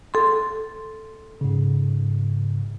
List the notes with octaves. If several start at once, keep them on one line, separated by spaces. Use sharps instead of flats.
A4 C6
G#2 C#3